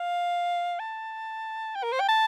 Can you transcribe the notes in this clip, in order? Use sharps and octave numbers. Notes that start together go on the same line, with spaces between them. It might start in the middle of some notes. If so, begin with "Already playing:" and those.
Already playing: F5
A5
G5
A#4
C5
G5
A5